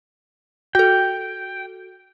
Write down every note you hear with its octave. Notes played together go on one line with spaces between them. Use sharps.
F#4 A4 G5